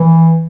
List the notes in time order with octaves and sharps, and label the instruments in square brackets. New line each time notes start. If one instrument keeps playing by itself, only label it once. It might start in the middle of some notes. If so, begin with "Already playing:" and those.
Already playing: [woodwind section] E3